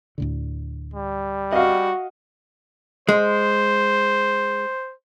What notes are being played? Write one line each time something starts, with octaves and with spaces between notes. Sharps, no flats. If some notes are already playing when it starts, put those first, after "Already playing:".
D2 A2 D3
G3
F#4 D#5 F5
G#3 C5